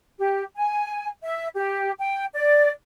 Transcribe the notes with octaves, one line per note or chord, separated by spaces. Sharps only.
G4
G#5
E5
G4
G5
D5